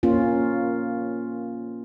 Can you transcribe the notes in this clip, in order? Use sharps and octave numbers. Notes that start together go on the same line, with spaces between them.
A#3 C#4 F4